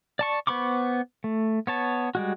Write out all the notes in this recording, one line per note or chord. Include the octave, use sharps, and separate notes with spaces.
D5 A5 C#6
B3 C5 B5 C#6 D6
A3
B3 C#5 A5
G3 G#3 F#4